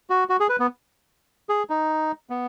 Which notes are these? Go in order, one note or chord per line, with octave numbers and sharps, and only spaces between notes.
F#4
F#4
G#4
B4
B3
G#4
D#4
B3